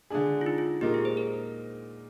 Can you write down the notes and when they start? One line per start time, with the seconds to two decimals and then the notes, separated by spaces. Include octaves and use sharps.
0.10 D3 G#3 D4 G#4
0.41 F4
0.46 D#4
0.58 F4
0.81 A#2 G#3 D#4 G4 A#4
0.94 G#4
1.05 C5
1.17 A#4